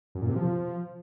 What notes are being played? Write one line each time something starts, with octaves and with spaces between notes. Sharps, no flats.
F#2
A#2
C3
F3